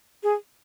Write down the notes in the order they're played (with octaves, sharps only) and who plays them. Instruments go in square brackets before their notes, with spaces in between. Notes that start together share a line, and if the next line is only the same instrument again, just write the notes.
[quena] G#4